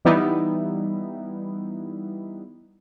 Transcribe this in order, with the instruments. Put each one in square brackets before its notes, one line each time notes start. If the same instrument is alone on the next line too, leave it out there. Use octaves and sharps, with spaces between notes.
[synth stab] E3 G3 B3 D#4 E4